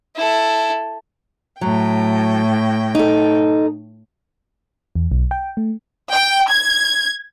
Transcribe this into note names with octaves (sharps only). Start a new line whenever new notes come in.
E4 A4
A2 F#3 G5
D#4 A4
E2
B1
G5
A3
G5
G#6